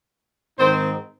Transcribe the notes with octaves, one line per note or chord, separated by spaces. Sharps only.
G#2 D#3 C4 D#4 C5